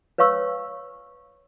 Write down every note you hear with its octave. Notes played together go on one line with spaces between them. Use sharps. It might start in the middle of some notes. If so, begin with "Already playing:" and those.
B4 C#5 F5 C#6 E6